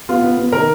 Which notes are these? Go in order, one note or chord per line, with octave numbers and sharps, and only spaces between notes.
B3 F4
B3
B3
D#3 A#4